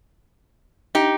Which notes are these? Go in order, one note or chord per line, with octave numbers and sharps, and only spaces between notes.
D#4 G4